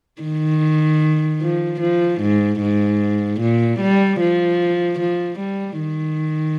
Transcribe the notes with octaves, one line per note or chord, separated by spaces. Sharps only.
D#3
F3
F3
G#2
G#2
A#2
G3
F3
F3
G3
D#3